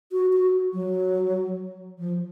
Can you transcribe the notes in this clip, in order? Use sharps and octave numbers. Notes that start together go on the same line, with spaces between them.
F#4
F#4
F#3
F3